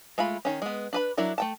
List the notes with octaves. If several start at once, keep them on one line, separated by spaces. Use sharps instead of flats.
G#3 A3 F4 B5
D#3 C#4
G#3 B3
D4 B4 B5
F#3 D4 E4 A#4
A3 G5 A5